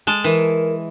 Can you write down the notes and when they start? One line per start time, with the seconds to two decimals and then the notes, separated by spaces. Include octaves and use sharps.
0.07 G#3 A5
0.24 E3 A#4